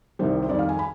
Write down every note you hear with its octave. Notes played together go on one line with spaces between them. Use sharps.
C2 C3 D#3 G3 C5
C5
F2 D#3 G3 D5
F5
G#5
B5